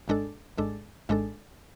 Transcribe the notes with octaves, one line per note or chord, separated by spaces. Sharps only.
G#1 G#2 G#3 D4 A4
G#1 G#2 G#3 D4 A4
G#1 G#2 G#3 D4 A4